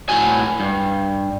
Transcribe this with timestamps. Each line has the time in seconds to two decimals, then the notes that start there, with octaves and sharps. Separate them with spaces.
0.09 A2 F#4 G#5
0.60 G2